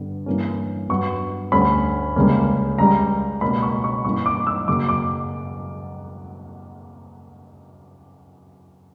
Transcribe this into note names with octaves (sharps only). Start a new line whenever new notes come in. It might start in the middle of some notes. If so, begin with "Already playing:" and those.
Already playing: G2 D3 G3 B3
G2 E3 A#3 C#4
G2 F#3 B3 C#6
D2 D3 G3 C#4 B5
C#2 C#3 G3 A#3 C#4
C#2 C#3 G3 A#5
C#2 B2 A#3 C#4 B5
C#6
C#6
G2 E3 A#3 C#4 C#6
D6
E6
F#2 C#3 F#3 A#3 D6
D6